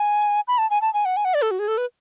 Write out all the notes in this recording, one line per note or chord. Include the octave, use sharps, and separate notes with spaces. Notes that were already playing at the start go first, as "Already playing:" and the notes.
Already playing: G#5
B5
A5
G#5
A5
G#5
F#5
G#5
F#5
D5
A4
F#4
G#4
A4
B4